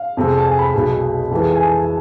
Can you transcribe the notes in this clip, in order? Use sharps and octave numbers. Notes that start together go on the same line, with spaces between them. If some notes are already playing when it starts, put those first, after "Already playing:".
Already playing: F5
F2 C3 G#3
A5
G#5
B5
B1 B2 G#3 B5
F2 E3 G#3
G#5
A5